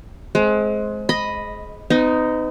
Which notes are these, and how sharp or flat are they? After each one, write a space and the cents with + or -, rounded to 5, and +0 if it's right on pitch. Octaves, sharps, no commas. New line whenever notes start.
G#3 +25 C4 +5
D#5 +0 B5 +0
B3 +45 D#4 +0